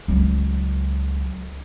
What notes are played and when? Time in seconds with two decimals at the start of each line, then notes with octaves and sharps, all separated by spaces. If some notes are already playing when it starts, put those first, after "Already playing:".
0.08 C#2 F#3